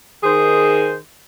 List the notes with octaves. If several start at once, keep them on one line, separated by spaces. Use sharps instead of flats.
D#3 G#4 C5